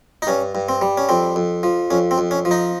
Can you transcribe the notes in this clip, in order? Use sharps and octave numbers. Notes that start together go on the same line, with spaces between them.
D#4
G2 C#4
G2
C4
G3
C#4
F2 C4
F2
F3
F2 C#4
C4
F2
C#4
F3
D#4